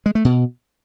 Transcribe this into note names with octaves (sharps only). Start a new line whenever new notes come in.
G#3
A3
B2